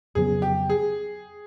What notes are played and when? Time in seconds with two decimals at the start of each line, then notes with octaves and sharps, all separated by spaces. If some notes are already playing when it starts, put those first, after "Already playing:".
0.15 F2 C#3 F#3 B3 G#4
0.42 G4
0.69 G#4